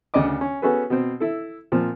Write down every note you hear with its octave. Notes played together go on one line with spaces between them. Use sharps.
D2 C#3 D5 D#5 D6
C#4
B3 C#4 F#4 G#4 A4 B4
B2 C4
E4 A4
A#2 F3 C4